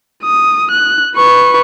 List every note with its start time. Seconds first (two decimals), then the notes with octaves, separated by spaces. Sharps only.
0.24 D#6
0.71 F#6
1.17 B4 C#6